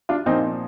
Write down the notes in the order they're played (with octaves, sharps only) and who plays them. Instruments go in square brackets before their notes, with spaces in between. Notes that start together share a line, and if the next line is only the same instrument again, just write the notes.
[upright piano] D4 F4
A#2 F3 C4 D#4